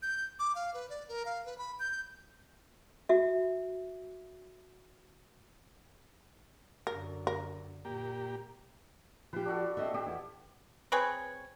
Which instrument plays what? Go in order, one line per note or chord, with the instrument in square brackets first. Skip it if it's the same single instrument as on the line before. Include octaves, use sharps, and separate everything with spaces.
[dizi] G6
D6
F5
B4
D5
A#4
F5
B4
B5
G6
[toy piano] F#4 E5
[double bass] F#2 D3 [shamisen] A#4
[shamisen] A#4
[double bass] A#2 [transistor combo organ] A#3 G4
[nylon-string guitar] F3 G4 [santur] B4
[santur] D4 F#4 A4
[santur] A3 [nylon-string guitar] C4 D#5 E5
[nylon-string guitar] C4 [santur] G4 D#5
[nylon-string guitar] E2 E4 A4
[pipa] C4 G#4 B4 C#5